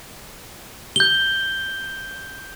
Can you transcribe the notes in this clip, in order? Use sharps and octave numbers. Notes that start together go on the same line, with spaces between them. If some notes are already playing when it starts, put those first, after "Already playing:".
G6 G7